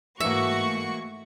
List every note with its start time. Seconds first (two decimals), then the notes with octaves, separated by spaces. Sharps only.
0.20 G#2 E3 A3 A#3 F#4 E5 C#6